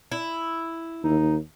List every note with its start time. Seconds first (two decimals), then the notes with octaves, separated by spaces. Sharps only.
0.11 E4
1.04 D#2 D#4